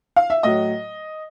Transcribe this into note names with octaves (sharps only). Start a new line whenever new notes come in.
F5
E5
A2 F#3 D#5